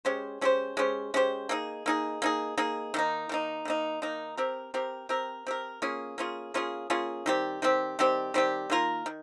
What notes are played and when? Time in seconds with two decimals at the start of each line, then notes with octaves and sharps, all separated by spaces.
0.05 G#3 C#4 G4 C5
0.41 G#3 C#4 G4 C5
0.77 G#3 C#4 G4 C5
1.14 G#3 C#4 G4 C5
1.49 A#3 D#4 G#4
1.86 A#3 D#4 G#4
2.22 A#3 D#4 G#4
2.58 A#3 D#4 G#4
2.94 D#3 A#3 D#4
3.29 D#3 A#3 D#4
3.65 D#3 A#3 D#4
4.02 D#3 A#3 D#4
4.37 C4 G4 A#4
4.74 C4 G4 A#4
5.09 C4 G4 A#4
5.47 C4 G4 A#4
5.82 A#3 C#4 F4 G#4
6.18 A#3 C#4 F4 G#4
6.54 A#3 C#4 F4 G#4
6.90 A#3 C#4 F4 G#4
7.26 D#3 G3 C4 G4
7.62 D#3 G3 C4 G4
7.99 D#3 G3 C4 G4
8.34 D#3 G3 C4 G4
8.70 D#3 A#3 F4 A#4
9.06 D#3